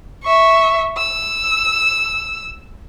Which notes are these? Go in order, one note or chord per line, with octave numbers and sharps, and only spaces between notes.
E5 C#6
E6